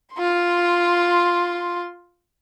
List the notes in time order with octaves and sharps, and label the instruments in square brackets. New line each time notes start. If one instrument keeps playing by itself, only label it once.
[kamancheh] F4 C6